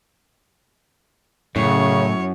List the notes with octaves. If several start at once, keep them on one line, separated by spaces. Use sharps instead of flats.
F#2 A2 C#3 C#5